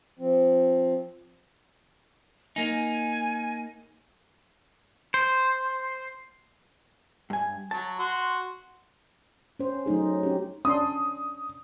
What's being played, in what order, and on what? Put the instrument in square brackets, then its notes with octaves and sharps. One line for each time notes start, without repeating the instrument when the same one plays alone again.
[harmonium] F3 C4
[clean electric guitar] A#3 D#4 [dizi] G#5
[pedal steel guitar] C5
[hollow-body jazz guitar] G2 G#5
[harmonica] F#3 [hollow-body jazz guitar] A5
[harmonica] F#4 C6
[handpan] C#4 C5
F#3 A3 D#4 G#4
C#4 G4
[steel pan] C#4 D4 C6 [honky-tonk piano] D#6